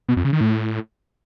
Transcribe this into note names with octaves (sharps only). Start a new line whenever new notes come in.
B2
F2
C#3
D#3
A2